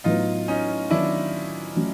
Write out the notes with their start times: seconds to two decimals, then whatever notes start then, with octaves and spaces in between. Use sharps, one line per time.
0.04 A2 F#3 B3 D#4 F4
0.48 C#4 D#4
0.90 D#3 F#3 B3 D4 E4
1.76 F#3 A3 C#4 F#4